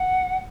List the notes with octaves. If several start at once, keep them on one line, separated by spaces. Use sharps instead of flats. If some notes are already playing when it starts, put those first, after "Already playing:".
Already playing: F#5